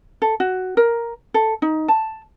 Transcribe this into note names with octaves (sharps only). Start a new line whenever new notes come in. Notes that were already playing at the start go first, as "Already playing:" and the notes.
A4
F#4
A#4
A4
D#4
A5